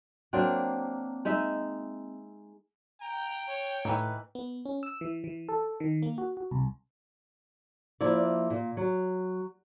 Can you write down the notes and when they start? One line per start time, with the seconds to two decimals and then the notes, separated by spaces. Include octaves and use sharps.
0.33 F#3 A#3 C4 D4
1.25 G#3 D#4 E5
3.01 G5 A#5
3.47 C#5
3.85 A2 D#3 E3 B4
4.35 B3
4.65 C#4
4.83 E6
5.01 E3
5.24 E3
5.49 A4
5.80 D#3
6.02 A#3
6.18 F#4
6.37 F#4
6.51 C2
8.01 F3 A#3 E4 D5
8.50 A#2
8.77 F#3